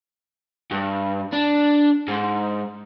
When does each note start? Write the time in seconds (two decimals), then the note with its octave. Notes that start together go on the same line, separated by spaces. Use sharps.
0.71 G2
1.33 D4
2.08 G#2